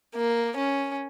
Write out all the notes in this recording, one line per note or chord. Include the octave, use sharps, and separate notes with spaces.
A#3
C#4